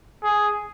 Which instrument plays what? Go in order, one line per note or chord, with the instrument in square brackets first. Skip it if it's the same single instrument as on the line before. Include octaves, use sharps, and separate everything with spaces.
[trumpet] G#4